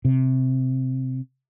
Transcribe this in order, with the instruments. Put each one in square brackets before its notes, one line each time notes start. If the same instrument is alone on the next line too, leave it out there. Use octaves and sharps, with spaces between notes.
[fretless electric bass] C3